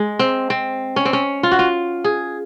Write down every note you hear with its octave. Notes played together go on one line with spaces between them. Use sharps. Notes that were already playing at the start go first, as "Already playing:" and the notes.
Already playing: G#3
C4
C4
C#4
C4
C#4
F4
F#4
F4
G#4